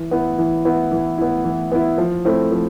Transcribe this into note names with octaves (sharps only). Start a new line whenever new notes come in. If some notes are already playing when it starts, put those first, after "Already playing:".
Already playing: E3
B3 E4
E3
B3 E4
E3
B3 E4
E3
B3 E4
F3
A3 C4 E4
F3